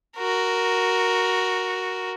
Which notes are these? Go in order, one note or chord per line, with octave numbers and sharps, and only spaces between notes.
F#4 A#4